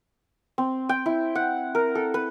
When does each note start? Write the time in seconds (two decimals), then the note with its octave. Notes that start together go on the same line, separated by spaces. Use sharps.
0.58 C4
0.89 G5
1.06 E4
1.35 F#5
1.75 A#4
1.95 A4
2.14 B4